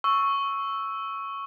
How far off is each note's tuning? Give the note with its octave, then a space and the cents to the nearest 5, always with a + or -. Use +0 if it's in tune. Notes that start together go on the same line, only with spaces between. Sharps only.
C#6 +0 E6 +0